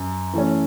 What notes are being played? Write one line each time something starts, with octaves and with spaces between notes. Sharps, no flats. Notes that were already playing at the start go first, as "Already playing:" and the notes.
Already playing: F#2
E3 A3 C#4